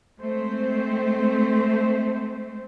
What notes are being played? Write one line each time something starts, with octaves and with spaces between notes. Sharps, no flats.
G#3 A3 C4 C5